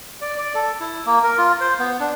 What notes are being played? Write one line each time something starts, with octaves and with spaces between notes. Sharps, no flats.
D5
D5
A4
E4
A#3
A#4
F4
C5
B3
D4